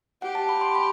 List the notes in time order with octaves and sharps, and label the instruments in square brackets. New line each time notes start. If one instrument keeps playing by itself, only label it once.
[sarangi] G4 [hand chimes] F#5
[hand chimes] A5
B5
C6
B5